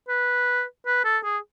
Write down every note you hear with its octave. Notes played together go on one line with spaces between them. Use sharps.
B4
B4
A4
G#4